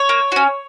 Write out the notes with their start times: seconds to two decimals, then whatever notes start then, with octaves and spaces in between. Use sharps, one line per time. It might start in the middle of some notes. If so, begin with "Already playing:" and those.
Already playing: C#5
0.09 A#3
0.32 C#4 F#4